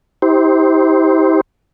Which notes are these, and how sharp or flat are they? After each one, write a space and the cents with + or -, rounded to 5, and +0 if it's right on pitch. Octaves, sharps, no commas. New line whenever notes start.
E4 -45 G4 +0 C5 +0